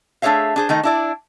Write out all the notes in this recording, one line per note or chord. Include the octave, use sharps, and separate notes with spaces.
A3 D4 G#4 C#5 E5 F5
D4 G#4 C5
D#3 A3 D#4
D4 E4 D5